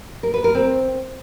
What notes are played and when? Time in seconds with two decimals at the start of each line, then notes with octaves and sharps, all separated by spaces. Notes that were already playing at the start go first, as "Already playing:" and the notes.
0.23 A#4
0.34 B4
0.44 A#4
0.55 C4